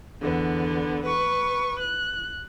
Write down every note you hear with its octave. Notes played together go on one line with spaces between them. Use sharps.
E2 D3 B3
B4 C#6
F#6